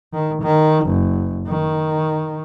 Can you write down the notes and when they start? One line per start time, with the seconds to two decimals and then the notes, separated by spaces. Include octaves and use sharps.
0.13 D#3
0.42 D#3
0.86 F#1
1.47 D#3